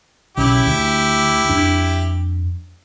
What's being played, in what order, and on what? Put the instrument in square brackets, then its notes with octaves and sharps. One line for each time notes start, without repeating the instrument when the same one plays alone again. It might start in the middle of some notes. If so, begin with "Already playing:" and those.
[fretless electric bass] B1 C#3 [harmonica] E4 G4
[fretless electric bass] D2
F2 D4